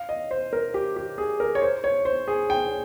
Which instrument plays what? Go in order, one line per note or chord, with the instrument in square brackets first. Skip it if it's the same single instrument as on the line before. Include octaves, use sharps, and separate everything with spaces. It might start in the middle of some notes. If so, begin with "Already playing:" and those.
Already playing: [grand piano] F5
D#5
C5
A#4
G4
G4
G#4
A#4
C#5
C5
C#5
C5
G#4
G5